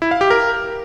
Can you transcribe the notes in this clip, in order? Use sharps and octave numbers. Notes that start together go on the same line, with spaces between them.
E4
F5
G4
A#4